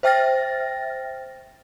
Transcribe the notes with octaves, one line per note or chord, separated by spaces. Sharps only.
C5 E5 G5 F6 A6 A#6